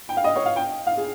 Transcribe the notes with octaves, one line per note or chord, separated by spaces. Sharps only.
G5
F5
D#5
C#5
F5
G5
F5
G#4